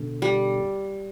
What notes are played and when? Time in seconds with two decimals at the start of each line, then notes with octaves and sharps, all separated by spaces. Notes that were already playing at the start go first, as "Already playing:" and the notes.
Already playing: B2 D3
0.22 G3